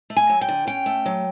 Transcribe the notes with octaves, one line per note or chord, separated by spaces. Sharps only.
A3
G#5
F#3
G5
D3
C#4 G5
A3
F#3